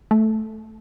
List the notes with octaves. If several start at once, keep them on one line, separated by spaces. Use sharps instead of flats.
A3